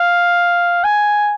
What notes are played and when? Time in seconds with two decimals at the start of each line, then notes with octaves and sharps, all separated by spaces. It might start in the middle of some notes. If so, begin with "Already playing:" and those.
Already playing: F5
0.84 G#5